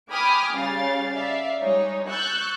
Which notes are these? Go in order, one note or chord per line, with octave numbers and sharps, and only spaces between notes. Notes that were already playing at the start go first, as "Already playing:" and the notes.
G5 G#5 B5 D6 D#6 F6
C#3 G3 F5 A6
D5 E5 F5
G3 G#3 D#4 C#5
C#6 E6 F#6 G6 A6